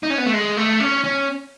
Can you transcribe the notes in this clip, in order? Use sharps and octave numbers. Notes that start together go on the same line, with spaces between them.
D#4
C#4
B3
A3
G#3
A3
C#4
C#4